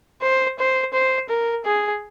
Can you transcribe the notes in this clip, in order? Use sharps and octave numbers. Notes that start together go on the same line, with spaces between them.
C5
C5
C5
A#4
G#4